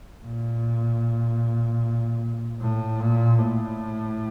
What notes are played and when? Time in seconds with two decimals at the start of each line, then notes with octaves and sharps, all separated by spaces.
0.24 A#2
2.61 A2
3.00 A#2
3.39 A2